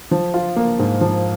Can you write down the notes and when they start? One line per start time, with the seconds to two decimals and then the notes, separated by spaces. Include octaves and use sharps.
0.11 F3
0.34 F4
0.56 A#3
0.79 G#2
1.01 F3